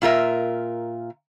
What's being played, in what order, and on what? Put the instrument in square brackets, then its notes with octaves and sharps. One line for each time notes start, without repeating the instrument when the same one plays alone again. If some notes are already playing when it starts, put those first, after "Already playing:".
[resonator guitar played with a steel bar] A#2 F4 A#4 E5